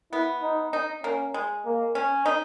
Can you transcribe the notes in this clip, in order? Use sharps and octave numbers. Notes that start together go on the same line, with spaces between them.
B3 E4
D#4
D#4
A#3 C#4
G#3
A#3
C#4
D#4